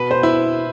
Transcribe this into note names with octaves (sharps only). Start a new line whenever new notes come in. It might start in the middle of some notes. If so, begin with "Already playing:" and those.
Already playing: B2 B4
C5
E4